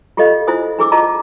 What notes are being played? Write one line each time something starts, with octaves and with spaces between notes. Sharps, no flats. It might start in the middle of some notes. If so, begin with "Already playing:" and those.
F4 G4 A4 C#5 D#5 F5
E4 F4 C5 G#5 D#6
D4 E4 G#4 D6 E6
F4 G#4 D#5 A5 A#5